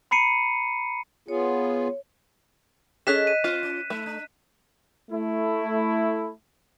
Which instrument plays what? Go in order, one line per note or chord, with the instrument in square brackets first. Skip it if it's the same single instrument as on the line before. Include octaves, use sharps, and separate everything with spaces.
[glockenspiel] A#5 B5 C7 C#7 D#7
[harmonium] B3 F4 G#4 [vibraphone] C#5
[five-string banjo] C#4 G#4 A4 [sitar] D#5 [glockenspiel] F#6 B6 E7
[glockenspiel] D#7
[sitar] C4 C5 [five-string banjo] F4
[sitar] C#4
[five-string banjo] A3 [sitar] D#4
[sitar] D4
[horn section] A3 E4